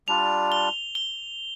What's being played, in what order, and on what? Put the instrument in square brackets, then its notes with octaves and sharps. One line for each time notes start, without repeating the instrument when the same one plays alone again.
[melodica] G3 D4 F4 [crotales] F7
[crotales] G7
G7